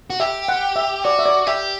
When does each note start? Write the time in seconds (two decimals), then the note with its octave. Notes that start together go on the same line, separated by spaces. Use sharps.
0.10 F#4
0.20 G4 E5
0.48 F#5
0.76 E5
1.04 F#4 D5
1.19 E5
1.26 D5
1.47 G4 E5